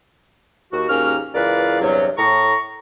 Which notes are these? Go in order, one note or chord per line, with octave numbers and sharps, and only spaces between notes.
D#2 F#4
D#2 G#2 A#3 C#4 F#4 F6
C#2 E3 A#4 B4 D5 F5
E2 G2 C3 F#3
A2 A#5 C#6